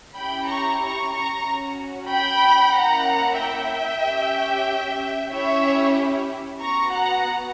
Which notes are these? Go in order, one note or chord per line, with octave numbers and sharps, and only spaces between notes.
C#4 E4 G4 G5 B5
A#5 C#6
A#5 C#6
A#5 C#6
C#4 F#4
G5 B5
A#3 C#4 E4 F#5 A#5
E5 G5
C#4 G4
C#4 E4 G4 C#5 E5
B3 F#4 A#5 C#6
F#5 A#5